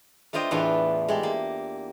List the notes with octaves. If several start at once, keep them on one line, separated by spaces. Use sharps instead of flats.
A3 D4 F4 C5 D#5 G5
E2 A2 D4 F4 B4 F5
G#3 A3 G4
A#3